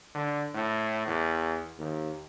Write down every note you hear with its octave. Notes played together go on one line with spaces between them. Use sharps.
D3
A2
E2
D#2